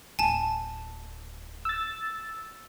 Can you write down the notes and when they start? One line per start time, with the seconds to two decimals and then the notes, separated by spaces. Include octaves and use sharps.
0.19 D1 G#5 A5
1.65 E6 A6